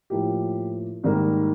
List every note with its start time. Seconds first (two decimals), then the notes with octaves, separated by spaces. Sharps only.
0.10 A2 F3 A#3 G4
1.04 G#2 D#3 G3 A#3